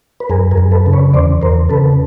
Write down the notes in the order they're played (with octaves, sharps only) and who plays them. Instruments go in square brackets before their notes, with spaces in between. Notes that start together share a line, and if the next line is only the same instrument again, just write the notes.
[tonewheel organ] B4
F#2 G#4 A#4
G#4 A#4
F#2
A4 B4
C#3
B4 C#5
E2 C5 D5
E2 A#4 C5
C#3 A4 B4